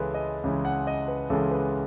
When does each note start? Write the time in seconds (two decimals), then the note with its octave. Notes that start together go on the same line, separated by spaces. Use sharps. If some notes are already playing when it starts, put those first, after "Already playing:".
Already playing: C#2 C#3 E3 G#3 A4 B4
0.14 D#5
0.44 C#2 C#3 E3 G#3
0.65 F#5
0.87 D#5
1.08 B4
1.30 C#2 C#3 E3 G#3 A4
1.51 B4